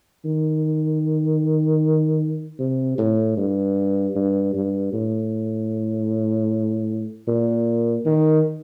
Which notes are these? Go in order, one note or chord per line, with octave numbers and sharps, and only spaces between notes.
D#3
C3
A2
G2
G2
G2
A2
A#2
D#3